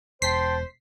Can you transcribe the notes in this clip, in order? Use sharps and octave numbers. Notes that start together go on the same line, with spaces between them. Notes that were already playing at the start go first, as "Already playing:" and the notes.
E1 C5 G5 A5 C6 B6 C7